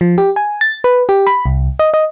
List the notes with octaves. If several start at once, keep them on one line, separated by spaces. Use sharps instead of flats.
F3
G4
G#5
A6
B4
G4
B5
C2
D#5
D#5